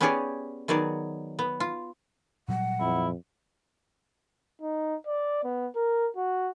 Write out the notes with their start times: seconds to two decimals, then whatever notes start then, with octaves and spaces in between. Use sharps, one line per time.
0.01 B3 C#4 G4 G#4 C#5 D5
0.68 D#3 F#3 B3 G#4 D5
1.39 B3
1.60 F4
2.48 A#2 F#3 G3 F#5
2.80 F2 E4
4.62 D#4
5.07 D5
5.44 B3
5.76 A#4
6.17 F#4